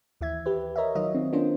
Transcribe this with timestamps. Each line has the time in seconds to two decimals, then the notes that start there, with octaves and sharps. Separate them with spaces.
0.21 D#2 E3 E5 G#6
0.46 G4 B4
0.76 A#4 C#5 D#5 E5
0.95 D#3 F#3 F4 D#5
1.15 D#3 C4
1.33 A#3 B3 C#4 D4 F4 C5